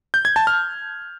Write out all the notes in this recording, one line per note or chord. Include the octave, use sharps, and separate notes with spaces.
G6
G#6
A5
F6